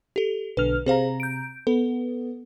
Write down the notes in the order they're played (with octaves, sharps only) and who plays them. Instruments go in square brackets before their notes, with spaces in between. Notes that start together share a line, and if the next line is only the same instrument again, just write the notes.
[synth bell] G4 A4
[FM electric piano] B1 D3 F6 [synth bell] B4
[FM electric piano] C3 A#5 [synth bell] G#4 C5 F5
[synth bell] G6 D7
[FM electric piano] B3 [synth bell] A4